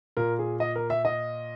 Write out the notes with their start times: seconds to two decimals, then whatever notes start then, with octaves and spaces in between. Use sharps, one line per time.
0.17 A#2 A#4
0.39 G#4
0.60 D#5
0.76 A#4
0.90 E5
1.05 D#5